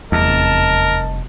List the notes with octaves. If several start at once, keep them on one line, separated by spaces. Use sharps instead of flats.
F1 E2 G3 A#4 D#5 A5